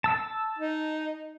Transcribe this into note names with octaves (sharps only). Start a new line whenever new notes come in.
A5 E6
D#4